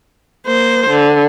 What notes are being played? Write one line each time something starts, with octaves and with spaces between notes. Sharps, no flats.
A#3 C5
D3